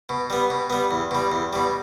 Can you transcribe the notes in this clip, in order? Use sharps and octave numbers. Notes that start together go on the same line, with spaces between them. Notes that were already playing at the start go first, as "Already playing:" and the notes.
B2
G3 B3
B2
G3 B3
E2
B2 G3
E2
B2 G3